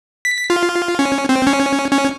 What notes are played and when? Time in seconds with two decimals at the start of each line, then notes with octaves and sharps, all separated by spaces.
0.25 B6
0.50 F4
0.99 C#4
1.29 C4
1.47 C#4
1.92 C#4